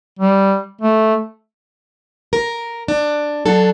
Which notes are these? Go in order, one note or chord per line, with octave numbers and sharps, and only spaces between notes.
G3
A3
A#4
D4
F#3 D4 A4